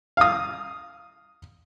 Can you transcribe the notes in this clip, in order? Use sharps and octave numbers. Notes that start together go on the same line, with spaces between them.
F5 D#6